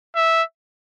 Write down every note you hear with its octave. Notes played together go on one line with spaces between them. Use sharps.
E5